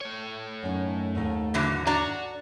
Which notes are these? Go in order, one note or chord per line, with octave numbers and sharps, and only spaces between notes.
A3 C#5
F#2 C#4 D#4
D#2 G#2 D#4
D3 E3 F#3
D4 F#4 D5 A#5